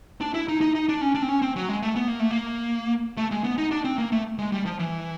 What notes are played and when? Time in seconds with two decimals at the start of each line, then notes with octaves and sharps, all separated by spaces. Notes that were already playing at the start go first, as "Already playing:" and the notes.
0.21 D4
0.34 E4
0.48 D#4
0.61 D#4
0.75 D#4
0.89 D4
1.01 C#4
1.15 D4
1.22 C4
1.28 C#4
1.42 C4
1.56 F#3
1.69 G#3
1.82 A3
1.96 B3
2.08 A#3
2.19 A3
2.31 A#3
3.17 A3
3.31 G#3
3.44 B3
3.58 D#4
3.71 D4
3.84 C4
3.98 A#3
4.12 A3
4.39 G#3
4.52 G3
4.65 F3
4.79 E3